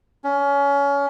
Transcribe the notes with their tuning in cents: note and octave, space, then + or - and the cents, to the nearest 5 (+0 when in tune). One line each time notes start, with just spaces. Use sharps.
C#4 +25